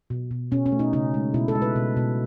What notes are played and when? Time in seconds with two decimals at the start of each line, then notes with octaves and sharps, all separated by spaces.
0.10 B2
0.31 B2
0.51 B2 C#4
0.66 C#4
0.72 A3
0.79 D#4
0.93 C#3 D#4
1.14 G#3
1.34 B2 E4
1.48 A4
1.55 G#3
1.62 B4
1.76 B2
1.97 B2